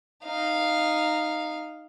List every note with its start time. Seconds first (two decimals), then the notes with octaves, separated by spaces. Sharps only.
0.24 D#4 F5